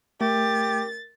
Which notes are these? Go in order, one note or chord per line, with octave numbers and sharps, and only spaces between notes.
A3 G4 A#4 A6